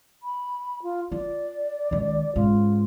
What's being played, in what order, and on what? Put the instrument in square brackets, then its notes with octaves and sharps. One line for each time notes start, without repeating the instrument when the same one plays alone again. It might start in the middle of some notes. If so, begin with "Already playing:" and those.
[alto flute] B5
F4
[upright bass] F4 [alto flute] D5
[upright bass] C#2 D#3
[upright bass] G#2 C#3 [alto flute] F4